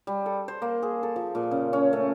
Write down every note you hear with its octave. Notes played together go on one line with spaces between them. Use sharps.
G3
A4
C5
A#3
G#4
A4
F3
A#2
C#3
C#4
A3